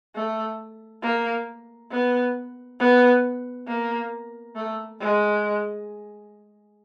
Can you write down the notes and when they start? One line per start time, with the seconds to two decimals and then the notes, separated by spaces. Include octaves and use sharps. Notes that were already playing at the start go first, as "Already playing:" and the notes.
0.15 A3
1.03 A#3
1.91 B3
2.80 B3
3.68 A#3
4.56 A3
5.00 G#3